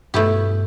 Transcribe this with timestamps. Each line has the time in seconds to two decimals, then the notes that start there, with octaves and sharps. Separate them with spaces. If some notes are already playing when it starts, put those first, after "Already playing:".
0.14 G2 B2 A3 E4 G4